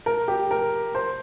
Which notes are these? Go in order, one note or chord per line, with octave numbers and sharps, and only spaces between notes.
A#4
G4
A#4
C5